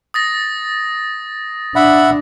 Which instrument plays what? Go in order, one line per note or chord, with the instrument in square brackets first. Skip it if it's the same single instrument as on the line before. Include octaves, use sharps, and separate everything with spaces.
[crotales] D#6 A6 A#6
[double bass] D4 [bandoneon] E5 F#5 B5